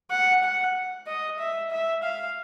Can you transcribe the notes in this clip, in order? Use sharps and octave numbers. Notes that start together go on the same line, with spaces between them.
F#5
F#5
D#5
E5
E5
F5